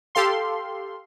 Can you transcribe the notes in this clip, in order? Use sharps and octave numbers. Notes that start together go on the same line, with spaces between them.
G4 A4 F5 C6